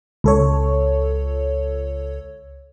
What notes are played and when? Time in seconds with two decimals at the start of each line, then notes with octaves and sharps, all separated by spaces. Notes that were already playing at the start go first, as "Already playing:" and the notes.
0.24 C#2 A4 C#5